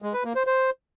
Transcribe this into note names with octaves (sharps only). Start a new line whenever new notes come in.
G#3
B4
A#3
C5
C5